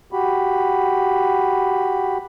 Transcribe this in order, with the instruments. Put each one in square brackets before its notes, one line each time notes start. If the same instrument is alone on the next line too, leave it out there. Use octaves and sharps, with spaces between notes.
[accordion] F#4 G4 B5